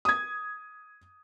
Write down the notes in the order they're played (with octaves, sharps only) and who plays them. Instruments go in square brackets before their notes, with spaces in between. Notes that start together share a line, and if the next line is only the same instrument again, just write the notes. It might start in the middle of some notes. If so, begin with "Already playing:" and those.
[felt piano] D#6 G#6